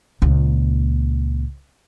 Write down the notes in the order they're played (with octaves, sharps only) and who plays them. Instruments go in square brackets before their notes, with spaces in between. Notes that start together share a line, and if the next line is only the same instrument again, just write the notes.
[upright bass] C#2 A#2